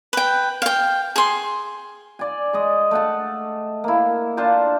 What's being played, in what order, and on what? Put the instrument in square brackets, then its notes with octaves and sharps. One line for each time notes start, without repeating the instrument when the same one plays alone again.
[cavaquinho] B4 G5
F5 G5
G#4 C6
[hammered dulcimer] D5 G#5
G#3 D#5
A3 F#5 A5
A#3 E4
D4 F4 C5 A5